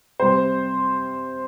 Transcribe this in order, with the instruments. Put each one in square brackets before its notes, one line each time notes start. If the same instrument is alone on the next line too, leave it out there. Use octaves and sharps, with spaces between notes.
[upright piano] C3 G3 C5